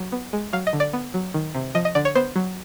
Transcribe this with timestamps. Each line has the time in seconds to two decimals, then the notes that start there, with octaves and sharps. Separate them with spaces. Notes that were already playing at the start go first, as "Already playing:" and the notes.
Already playing: F#3
0.12 B3
0.33 G#3
0.53 F#3 F5
0.67 D#5
0.73 D3
0.80 D5
0.93 B3
1.14 F#3
1.34 D#3
1.55 C3
1.75 F3 D#5
1.85 D#5
1.95 D3 D5
2.05 C#5
2.15 B3 C5
2.36 F#3